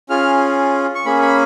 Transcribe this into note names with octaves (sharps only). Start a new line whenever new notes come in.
C#4 F4 G#4 F6
C#6
A#3 C#4 G#4 B5
B5